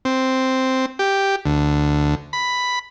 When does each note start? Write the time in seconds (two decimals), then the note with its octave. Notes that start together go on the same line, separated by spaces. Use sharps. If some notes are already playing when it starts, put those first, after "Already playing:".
0.05 C4
0.99 G4
1.46 D2
2.33 B5